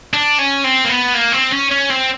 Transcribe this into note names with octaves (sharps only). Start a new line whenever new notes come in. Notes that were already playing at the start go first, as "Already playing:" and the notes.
D4
C#4
C4
A#3
B3
A#3
C4
C#4
C#4
C4